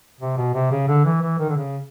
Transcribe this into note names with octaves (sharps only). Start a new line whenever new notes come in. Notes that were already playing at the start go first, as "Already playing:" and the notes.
C3
B2
C3
C#3
D3
E3
E3
D#3
D3
C#3